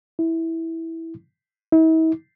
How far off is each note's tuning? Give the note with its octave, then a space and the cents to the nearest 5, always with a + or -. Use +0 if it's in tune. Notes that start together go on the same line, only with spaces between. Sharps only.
E4 -10
E4 -45